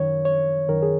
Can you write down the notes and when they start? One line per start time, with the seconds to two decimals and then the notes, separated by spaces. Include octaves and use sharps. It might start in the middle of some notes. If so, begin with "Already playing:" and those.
Already playing: F#2 D#3 C#5
0.25 C#5
0.69 F#2 D#3 A#4
0.82 G#4